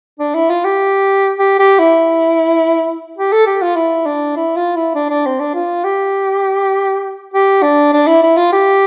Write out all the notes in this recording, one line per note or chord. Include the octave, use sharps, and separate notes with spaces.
D4
E4
F4
G4
G4
G4
E4
G4
A4
G4
F4
E4
D4
E4
F4
E4
D4
D4
C4
D4
F4
G4
G4
D4
D4
E4
E4
F4
G4